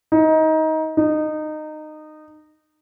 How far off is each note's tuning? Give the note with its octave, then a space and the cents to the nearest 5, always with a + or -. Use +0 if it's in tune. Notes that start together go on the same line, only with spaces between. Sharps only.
D#4 +20
D#4 -20